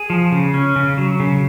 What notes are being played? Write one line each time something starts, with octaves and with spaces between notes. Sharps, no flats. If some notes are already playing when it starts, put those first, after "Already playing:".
Already playing: G#4
F3
C#3
C#4
C#3
F#3
C#3